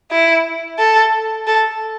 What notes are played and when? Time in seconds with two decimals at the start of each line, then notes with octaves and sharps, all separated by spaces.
0.11 E4
0.79 A4
1.47 A4